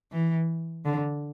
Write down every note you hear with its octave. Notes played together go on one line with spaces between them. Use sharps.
E3
D3